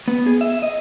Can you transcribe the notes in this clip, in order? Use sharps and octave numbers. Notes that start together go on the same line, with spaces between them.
B3
G#4
E5
D#5